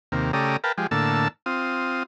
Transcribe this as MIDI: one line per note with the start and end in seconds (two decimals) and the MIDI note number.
0.12 0.32 39
0.12 0.32 48
0.12 0.32 58
0.33 0.57 49
0.33 0.57 57
0.33 0.57 67
0.33 0.57 74
0.33 0.57 82
0.33 0.57 87
0.64 0.72 70
0.64 0.72 71
0.64 0.72 77
0.64 0.72 79
0.64 0.72 81
0.78 0.87 53
0.78 0.87 56
0.78 0.87 67
0.91 1.28 45
0.91 1.28 50
0.91 1.28 58
0.91 1.28 81
0.91 1.28 88
1.46 2.03 60
1.46 2.03 65
1.46 2.03 87